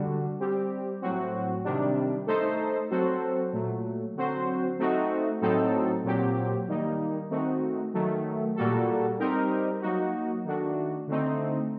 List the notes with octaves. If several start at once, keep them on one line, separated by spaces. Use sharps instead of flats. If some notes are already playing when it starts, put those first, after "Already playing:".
Already playing: D3 G3 D4 F#4
G3 C4 G4
A2 F#3 C4 F#4
C3 D#3 G3 D4
A3 D#4 A4 C5
F#3 C4 F#4 A4 C5
A#2 F#3 A3
D3 F#3 C4 F#4 C5
A3 C4 D#4 F#4
A2 F#3 C4 D#4 A4
A#2 F#3 C4 G4
D#3 G3 A#3 D#4
D#3 A3 C4 D#4 F#4
D#3 F#3 A3
A#2 G3 A#3 F#4 A4
G3 C4 D#4 G4 A#4
F#3 A#3 D#4 F#4
D#3 A3 D4 F#4
D3 A3 C4 D#4